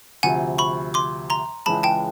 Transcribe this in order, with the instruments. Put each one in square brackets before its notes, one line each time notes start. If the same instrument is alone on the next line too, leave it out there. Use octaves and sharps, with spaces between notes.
[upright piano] D2 C3 F3 [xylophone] F#5 G#5
[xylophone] B5 C#6
C6 D6
A#5 C6
[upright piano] C#2 C#3 E3 G#3 [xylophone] A5 B5
[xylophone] G5 A5